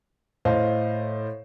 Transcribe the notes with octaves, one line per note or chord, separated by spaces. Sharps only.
A2 C5 D#5 F5